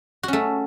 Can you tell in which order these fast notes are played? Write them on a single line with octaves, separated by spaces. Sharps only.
F#4 C#4 A3